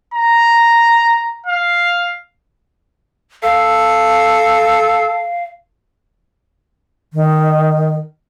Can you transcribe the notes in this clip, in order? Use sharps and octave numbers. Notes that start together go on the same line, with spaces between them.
A#5
F5
A4 F5
D#3